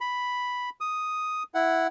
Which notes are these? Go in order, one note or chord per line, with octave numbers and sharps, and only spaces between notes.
B5
D#6
E4 F#5